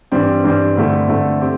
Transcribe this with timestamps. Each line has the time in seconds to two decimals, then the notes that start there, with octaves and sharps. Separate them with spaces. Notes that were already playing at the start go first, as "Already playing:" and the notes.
0.12 G2 E3 G3 C4
0.44 G2 E3 G3 C4
0.77 G2 D3 A3 C4 E4
1.08 G2 D3 A3 C4 E4
1.41 C4 G4